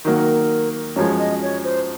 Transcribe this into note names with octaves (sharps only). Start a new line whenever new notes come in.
D#3 F#3 A#3 A#4
F#2 F3 G#3 C#5
D#5
C#5
C5